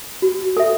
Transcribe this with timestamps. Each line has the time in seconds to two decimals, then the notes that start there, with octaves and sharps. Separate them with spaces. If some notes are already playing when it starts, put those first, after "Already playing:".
0.22 F#4
0.57 A4 E5